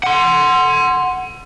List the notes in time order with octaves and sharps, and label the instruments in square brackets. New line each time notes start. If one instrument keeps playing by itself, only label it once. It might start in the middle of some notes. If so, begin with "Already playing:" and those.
[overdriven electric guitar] F#5 C6